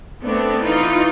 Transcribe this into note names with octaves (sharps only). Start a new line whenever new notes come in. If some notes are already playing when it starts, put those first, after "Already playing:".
A3 B3 C4 D4
E3 D#4 F4